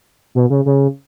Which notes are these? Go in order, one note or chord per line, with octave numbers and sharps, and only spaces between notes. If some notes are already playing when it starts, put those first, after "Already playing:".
B2
C#3
C#3